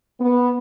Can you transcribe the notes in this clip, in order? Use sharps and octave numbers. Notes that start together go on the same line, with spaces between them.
B3